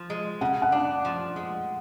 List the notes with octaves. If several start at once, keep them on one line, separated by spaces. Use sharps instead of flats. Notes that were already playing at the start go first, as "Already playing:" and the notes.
Already playing: F3
G#3
C#3 F#5
F#5
D4
F3
G#3